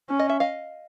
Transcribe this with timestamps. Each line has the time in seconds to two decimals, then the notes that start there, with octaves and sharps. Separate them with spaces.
0.09 C#4
0.19 D#5
0.29 E5
0.40 D#5 F5